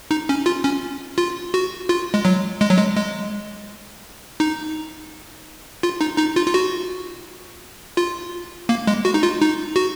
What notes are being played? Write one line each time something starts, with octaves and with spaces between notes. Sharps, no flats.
D#4
C#4
F4
C#4
F4
F#4
F4
G#3
F#3
G#3
F#3
G#3
G#3
D#4
F4
D#4
D#4
F4
F4
F#4
F4
A#3
G#3
F#4
D#4
F4
D#4
F#4